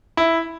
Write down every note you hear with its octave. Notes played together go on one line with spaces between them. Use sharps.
E4